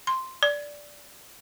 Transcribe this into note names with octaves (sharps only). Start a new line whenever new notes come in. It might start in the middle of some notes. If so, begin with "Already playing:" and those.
C6
D5